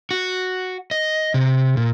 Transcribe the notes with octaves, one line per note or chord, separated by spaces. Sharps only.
F#4
D#5
C3
A#2